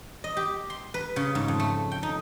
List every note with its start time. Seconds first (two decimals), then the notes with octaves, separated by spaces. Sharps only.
0.24 D#5
0.37 G4
0.70 C6
0.94 B4
1.16 C#3
1.35 G#2
1.48 F2
1.60 A3
1.92 G5
2.03 D#4